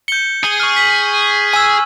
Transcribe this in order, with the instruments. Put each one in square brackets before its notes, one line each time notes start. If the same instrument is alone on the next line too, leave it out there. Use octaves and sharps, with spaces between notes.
[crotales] G6 G7 [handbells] C#7
[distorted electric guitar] G#4 [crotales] G7
[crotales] C#6 F6
B6 F#7
[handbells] G#5 E6